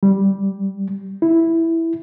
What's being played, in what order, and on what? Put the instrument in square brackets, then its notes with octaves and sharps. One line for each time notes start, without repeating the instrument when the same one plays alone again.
[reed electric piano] G3
E4